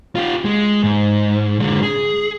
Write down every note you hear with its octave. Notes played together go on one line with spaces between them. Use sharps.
F4 G4
G#3
G#2
D3 G#3
G#4